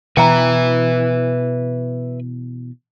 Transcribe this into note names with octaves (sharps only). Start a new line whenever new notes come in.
B2 E3 B4 E5 G5 A#5